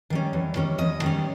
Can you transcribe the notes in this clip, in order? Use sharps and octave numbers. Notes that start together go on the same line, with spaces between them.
D#3 G3 C#4
E2
D#3 G3 C#4
E2 D#5
D#3 G3 C#4